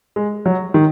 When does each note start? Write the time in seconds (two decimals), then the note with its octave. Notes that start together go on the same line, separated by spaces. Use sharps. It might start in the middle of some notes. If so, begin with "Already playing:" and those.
0.16 G#3
0.46 F#3
0.74 D#3